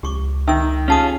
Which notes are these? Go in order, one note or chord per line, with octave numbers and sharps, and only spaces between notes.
C#2 G4 C#6 D6
D#3 E5 E6
C#4 F4 G4 G#4 A5 D#6